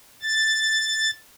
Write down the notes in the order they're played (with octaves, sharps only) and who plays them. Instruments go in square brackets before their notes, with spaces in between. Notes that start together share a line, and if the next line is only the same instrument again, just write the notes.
[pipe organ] A6